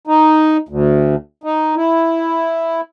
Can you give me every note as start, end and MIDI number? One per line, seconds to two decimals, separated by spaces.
0.07 0.57 63
0.69 1.15 38
1.44 1.75 63
1.76 2.81 64